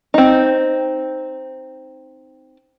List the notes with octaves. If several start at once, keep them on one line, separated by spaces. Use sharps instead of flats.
C4 D#4